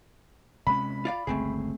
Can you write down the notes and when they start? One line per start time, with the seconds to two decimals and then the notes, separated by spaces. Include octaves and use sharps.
0.67 C3 G#3 C#4 B5
1.05 F4 D5 F5
1.27 G1 C#2 A3 C4 G#4